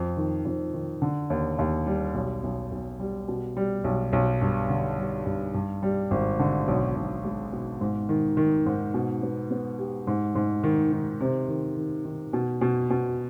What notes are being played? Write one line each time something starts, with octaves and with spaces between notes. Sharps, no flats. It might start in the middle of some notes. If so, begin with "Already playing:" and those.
Already playing: F2
D#3
F2
D#3
D3
D#2
D#2
G3
B1
B1
B1
G3
B2
G3
B1
B1
G2
D3
G3
G2
G2
G3
G#1
D3
B1
B1
G#3
B2
G#2
D#3
D#3
G#2
B2
B3
B3
G4
G#2
G#2
D#3
D#3
C3
D#3
D#3
D#3
B2
B2
B2